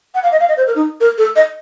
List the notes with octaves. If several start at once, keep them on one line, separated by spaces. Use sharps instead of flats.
F#5
F5
D#5
F5
D#5
C5
A#4
D#4
A#4
A4
D#5